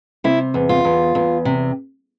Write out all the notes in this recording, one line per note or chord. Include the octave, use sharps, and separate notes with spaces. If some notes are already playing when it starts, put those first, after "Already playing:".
C3 E4
E2
F4
E2
E2
C3